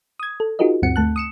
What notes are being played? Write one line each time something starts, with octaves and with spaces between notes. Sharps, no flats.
D#6 G#6
A4
D#4 F4 F#4 G#4 A#4 D#5
D2 G2 C4 F#5 C#7
D2 A3 A5 F#6
D#6 C#7 E7